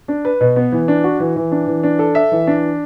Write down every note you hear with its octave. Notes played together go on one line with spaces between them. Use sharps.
D4
B4
B2
B3
E3
D4
F#4
E3
E3
D4
E3
D4
A4
E5
E3
D4